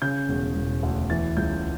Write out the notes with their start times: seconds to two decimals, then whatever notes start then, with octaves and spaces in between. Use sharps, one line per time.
0.02 C#3 G6
0.29 E1
0.56 E1
0.83 D2
1.10 E3 A6
1.37 C#2 G6